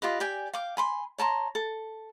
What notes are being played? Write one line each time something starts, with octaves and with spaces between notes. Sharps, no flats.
F4 G4 B4 D#5
G4 D5 G5 G#5
F5 G5 D6
G#5 B5 C6
C#5 A5 A#5 C6
A4